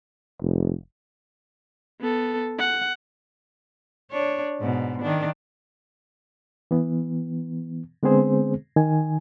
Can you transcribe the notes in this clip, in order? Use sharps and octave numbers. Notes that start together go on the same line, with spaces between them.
F1
B3 A4
F#5
D4 C#5
G#2 B2
D#3 D4
E3 B3
D3 G#3 B3 C4 G#4 C5
D#3 G#5